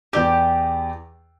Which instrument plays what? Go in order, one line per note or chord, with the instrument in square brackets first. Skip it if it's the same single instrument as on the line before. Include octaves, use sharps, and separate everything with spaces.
[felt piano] E2 D5 D6 [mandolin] G4